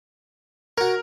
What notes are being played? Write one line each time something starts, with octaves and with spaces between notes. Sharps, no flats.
F#4 A#4 C#5